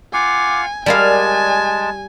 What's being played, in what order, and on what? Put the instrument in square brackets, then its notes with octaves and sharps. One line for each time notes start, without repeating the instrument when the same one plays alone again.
[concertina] F4 F5 F#5 [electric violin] G#5 [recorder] D6
[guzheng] G3 A#4 F5 [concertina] G#3 A5 [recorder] D5 [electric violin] G#5